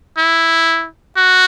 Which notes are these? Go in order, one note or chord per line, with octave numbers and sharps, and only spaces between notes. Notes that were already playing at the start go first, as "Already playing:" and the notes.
E4
F#4